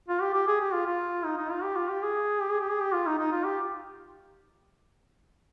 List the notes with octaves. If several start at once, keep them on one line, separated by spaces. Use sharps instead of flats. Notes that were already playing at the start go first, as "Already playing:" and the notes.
F4
G4
G4
G#4
G4
F4
F4
D#4
D#4
F4
G4
F4
G4
G#4
G4
G#4
G4
G#4
G4
F4
D#4
D#4
F4
G4